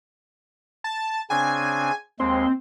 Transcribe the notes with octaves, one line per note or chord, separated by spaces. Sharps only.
A5
C#3 C4 D4 G#5
D#2 G#3 C4 C6